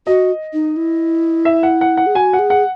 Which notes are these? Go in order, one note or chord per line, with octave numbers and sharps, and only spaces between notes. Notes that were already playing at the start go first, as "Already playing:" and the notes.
F#4 D#5
D#4
E4
E5
F#5
F#5
F#5
G#4
F#4 G#5
F#5
G#4
F#5